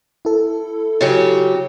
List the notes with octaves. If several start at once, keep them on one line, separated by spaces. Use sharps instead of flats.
E4 A4
C#3 F#3 G4